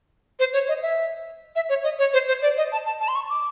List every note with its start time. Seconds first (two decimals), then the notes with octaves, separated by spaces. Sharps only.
0.39 C5
0.53 C#5
0.68 D#5
0.82 E5
1.56 E5
1.69 C#5
1.84 D#5
1.99 C#5
2.13 C5
2.28 C5
2.42 D5
2.57 D#5
2.72 A5
2.85 A5
3.01 A5
3.08 C6
3.15 C#6
3.29 D6